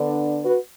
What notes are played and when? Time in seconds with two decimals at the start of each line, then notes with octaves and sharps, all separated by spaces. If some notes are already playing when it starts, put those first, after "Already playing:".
Already playing: D3 B3 D4
0.44 F#4 B4